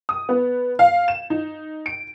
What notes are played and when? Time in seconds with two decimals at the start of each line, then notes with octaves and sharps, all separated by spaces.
0.09 D#6
0.29 B3
0.79 F5
1.08 E7
1.30 D#4
1.86 D7